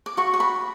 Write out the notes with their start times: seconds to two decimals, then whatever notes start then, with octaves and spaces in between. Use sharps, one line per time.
0.06 D6
0.17 F#4 C#6
0.34 C#6
0.40 B5